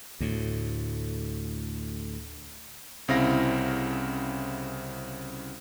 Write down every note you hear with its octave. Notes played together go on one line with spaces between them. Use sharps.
D2 A2
C2 C#3 C4 E4 F5 A#6